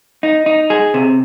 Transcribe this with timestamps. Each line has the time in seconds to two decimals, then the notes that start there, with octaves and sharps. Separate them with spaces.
0.23 D#4
0.46 D#4
0.70 G#4
0.94 C3